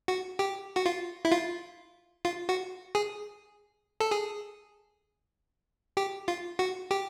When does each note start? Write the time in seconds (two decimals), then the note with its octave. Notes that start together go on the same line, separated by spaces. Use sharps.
0.08 F#4
0.39 G4
0.76 F#4
0.86 F4
1.25 E4
1.32 F4
2.25 F4
2.49 F#4
2.95 G#4
4.00 A4
4.11 G#4
5.97 G4
6.28 F4
6.59 F#4
6.91 G4